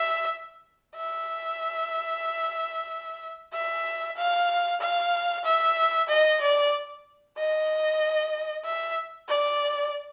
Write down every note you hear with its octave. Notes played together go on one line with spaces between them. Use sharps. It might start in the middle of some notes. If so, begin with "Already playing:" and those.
Already playing: E5
E5
E5
F5
F5
E5
D#5
D5
D#5
E5
D5